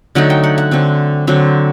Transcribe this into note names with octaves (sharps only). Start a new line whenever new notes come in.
D3 F#3 A3 D#4 F#5
G5
F#5
F#5
D3 F#3 C4
D3 F#3 C4